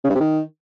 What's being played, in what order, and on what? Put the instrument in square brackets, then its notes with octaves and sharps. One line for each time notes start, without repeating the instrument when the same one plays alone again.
[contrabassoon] C#3
G2
C3
D#3